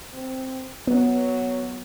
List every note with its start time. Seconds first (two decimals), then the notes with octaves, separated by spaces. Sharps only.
0.13 C4
0.87 F#3 B3